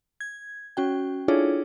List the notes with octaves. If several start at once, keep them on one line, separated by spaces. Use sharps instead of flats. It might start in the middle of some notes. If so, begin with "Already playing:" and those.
G#6
C#4 F#4 G5
D4 E4 F4 G#4 A4 C#5